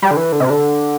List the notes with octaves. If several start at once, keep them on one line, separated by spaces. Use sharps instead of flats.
G3
D3
E3
D3
C3
D3